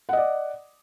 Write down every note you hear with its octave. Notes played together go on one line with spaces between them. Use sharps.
D5 D#5 F#5